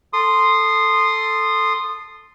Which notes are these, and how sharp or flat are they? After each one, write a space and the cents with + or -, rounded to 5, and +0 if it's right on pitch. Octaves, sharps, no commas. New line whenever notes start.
A4 +0 C6 -5 D#6 -20